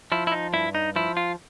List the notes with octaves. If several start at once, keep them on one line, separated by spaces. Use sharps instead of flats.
F3 E4
E4
D#4
G2 E4
D#4
F3 E4
F4